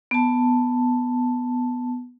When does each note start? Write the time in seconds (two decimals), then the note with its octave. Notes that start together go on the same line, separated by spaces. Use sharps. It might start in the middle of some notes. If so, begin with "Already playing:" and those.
0.11 B3 A5